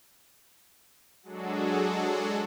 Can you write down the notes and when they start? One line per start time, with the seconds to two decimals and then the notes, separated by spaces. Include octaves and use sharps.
1.23 F#3 G#3 D4 F#4 G#4 A4